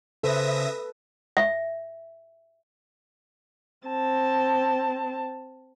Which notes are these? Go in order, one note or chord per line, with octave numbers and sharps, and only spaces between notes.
C#3 A4 B4 C5 E5 D#6 A#6
E5
C4 A5